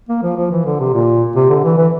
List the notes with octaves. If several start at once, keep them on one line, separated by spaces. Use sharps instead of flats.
A#3
F3
F3
E3
D3
C3
A#2
C3
D3
E3
E3